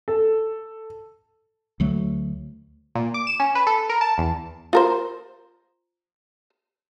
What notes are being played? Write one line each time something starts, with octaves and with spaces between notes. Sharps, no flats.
A4
D2 F#3 A3
A#2
D6
E7
C#4
B4
A4
A#4
A5
E2
F4 A#4 C5